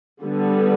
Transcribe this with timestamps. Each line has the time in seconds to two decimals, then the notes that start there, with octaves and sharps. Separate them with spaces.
0.23 D3 G3 B3